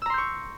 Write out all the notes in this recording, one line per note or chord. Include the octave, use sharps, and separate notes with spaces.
A#5 C6 C#6 E6 G6